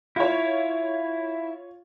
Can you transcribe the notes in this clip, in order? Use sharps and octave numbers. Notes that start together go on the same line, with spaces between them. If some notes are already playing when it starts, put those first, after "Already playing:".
E4 F4 C#5